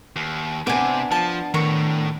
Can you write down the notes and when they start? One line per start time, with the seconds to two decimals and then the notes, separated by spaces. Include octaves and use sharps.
0.16 D#2
0.67 C3 B3 D4 G#5 D6
1.12 F3 A5
1.54 A2 D#3 A#5 C#6